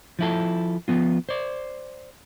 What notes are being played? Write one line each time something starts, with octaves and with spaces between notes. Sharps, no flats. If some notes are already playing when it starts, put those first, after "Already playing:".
F3 E4 A4
F3 B3 F4
C5 D5